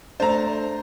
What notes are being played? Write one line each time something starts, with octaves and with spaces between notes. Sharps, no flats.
A3 D4 C5 A#5